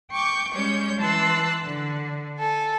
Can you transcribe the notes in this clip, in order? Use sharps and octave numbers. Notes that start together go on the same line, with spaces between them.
G5 C#6 D6 G6
G3 G#3 C#4 C#5 G6
E3 A5 C6 E6 F#6
D3
A4 G#5